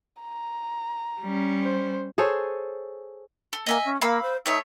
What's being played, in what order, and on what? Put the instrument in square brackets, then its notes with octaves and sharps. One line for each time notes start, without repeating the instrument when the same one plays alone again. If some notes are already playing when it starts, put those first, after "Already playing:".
[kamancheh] A#5
[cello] G3 C#4
[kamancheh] C5
[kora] G#4 A4 C5 C#5
[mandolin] A4
[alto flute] A#3 [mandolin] D#5 E5 G#5
[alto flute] C#4
[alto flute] A#3 [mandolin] F5 B5 E6
[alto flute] C5
[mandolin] A3 C#5 E5 [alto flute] D#4